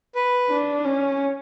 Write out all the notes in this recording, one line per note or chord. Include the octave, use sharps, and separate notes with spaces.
B4
D4
C#4